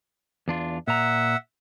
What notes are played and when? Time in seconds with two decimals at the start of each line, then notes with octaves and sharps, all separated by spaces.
0.48 E2 D4 F4
0.88 A#2 E5 F#5 A#5